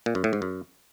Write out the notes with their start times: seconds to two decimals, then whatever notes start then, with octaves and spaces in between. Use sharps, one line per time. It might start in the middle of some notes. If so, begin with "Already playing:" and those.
0.06 A#2
0.15 F#2
0.24 A2
0.33 G#2
0.42 F#2